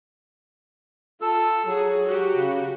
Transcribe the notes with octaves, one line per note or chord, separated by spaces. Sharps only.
F4 A4 E6
F#3 F#4 G#4
F#4 G4
C#3